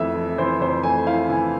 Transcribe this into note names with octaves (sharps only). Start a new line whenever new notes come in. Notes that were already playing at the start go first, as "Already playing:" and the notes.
Already playing: F2 E3 A3 E5
E4
E3 C5
F2 C5
A3 G#5
E4 F5
E3 G#5